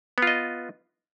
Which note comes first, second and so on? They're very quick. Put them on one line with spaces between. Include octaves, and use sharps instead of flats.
B3 F4 D#5